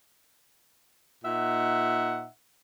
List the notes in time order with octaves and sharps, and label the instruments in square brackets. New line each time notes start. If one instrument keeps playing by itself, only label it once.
[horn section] A#2 D#4 E5 F#5